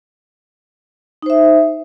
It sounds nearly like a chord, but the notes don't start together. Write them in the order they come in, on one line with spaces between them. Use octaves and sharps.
D#4 C5 E5